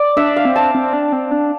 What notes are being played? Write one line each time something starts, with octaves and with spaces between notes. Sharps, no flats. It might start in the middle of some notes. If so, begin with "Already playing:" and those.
Already playing: D5
D4 E5
F5
C4
A5
C4
D4
C4
D4